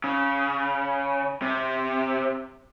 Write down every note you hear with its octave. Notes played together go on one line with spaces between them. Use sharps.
C#3
C3